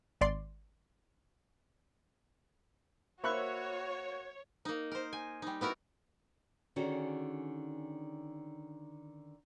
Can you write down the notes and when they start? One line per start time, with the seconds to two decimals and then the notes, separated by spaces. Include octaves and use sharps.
0.21 G#1 D5 C6
3.24 A#3 F#4 C5 C#5 E5 B5 C#6 F#6
4.65 A#3 D#4
4.91 A#4 C5
5.13 G#5
5.42 G3 D#4
5.61 B3 E4 F#4 A#4
6.76 D3 D#3 C#4 F#4 G#4 A4